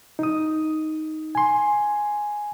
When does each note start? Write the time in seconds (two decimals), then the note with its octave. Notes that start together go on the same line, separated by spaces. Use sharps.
0.19 D#4 D#6
1.35 G#5 C6